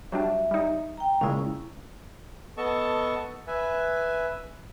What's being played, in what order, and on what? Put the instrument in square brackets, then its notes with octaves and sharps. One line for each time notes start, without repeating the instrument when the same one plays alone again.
[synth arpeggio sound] F#3 G3 D4 [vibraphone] E5
[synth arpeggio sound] G3 D#4
[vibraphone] G5 A#5
[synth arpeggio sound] A#2 C#3 G#3 [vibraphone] C#4 E4
[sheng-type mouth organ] B3 A4 D#5 A5 C#6
B4 E5 G#5